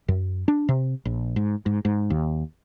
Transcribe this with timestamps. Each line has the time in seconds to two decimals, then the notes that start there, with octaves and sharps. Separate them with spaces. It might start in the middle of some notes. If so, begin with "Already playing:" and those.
0.08 F#2
0.48 D4
0.69 C3
1.05 A#1
1.36 G#2
1.66 G#2
1.85 G#2
2.10 D#2